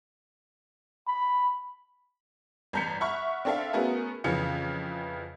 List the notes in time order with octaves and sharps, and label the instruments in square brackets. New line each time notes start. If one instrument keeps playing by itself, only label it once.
[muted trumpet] B5
[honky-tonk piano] A1 G2 A#5 G6 B6 C#7
E5 F#5 B5 C#6 F6
C4 D4 A4 E5 F5
A3 B3 C#4 F#4 G#4 A#4
F2 C#3 E3 F5 C#7